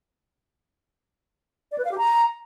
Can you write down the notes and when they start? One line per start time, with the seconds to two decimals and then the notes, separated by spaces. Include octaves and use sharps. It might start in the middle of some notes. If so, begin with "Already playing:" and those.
1.72 D5
1.78 B4
1.85 F5
1.91 G4
1.98 A#5